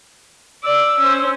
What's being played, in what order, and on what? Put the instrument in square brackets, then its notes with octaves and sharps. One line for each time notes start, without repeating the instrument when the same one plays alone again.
[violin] D5 [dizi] E6
[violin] C#4 C5